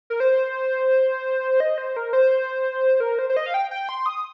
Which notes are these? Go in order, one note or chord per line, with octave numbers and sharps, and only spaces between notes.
A#4
C5
D#5
C5
A#4
C5
A#4
C5
C5
D#5
F5
G5
G5
C6
D#6